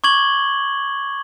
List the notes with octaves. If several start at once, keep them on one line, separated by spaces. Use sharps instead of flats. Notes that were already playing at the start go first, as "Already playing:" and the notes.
C#6 D6 G#6 F#7 G7